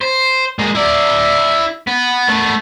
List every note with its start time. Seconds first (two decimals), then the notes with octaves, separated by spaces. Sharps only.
0.01 C5
0.59 G#3 A#3
0.75 E4 D5
1.87 B3
2.28 A3 B3